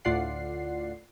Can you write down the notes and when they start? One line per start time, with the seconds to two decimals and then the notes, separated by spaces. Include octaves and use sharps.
0.05 D2 A2 F4 D5 F#5 C7